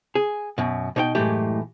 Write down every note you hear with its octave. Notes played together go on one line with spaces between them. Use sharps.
G#4
F#2 B2
B2 D#4 C#5 G5
F#2 A2 E3 G#3 A3 G4